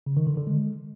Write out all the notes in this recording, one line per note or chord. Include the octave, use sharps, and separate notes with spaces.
C#3
D#3
D3
D3
G#3